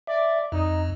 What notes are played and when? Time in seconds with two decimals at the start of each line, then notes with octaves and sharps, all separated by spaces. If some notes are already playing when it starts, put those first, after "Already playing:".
0.07 D5 E5
0.52 F2 D#4